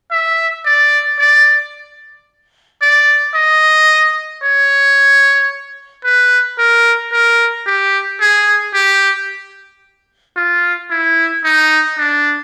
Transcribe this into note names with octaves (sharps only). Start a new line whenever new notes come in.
E5
D5
D5
D5
D#5
C#5
B4
A#4
A#4
G4
G#4
G4
F4
E4
D#4
D4